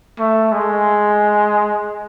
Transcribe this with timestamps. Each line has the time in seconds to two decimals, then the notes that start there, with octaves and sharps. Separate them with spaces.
0.19 A3
0.52 G#3